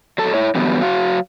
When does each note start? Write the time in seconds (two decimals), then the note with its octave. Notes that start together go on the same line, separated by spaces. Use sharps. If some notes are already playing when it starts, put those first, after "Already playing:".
0.18 F#3 A4 A5
0.34 E4 C#5
0.55 D3 E3 F#3 G3 B3
0.81 F#3 F#4 F5